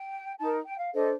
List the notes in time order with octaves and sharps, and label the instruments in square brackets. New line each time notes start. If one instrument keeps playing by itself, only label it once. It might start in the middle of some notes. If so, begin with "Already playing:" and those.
Already playing: [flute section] G5
D#4 A#4 A5
G5
F5
D4 A4 C5 D#5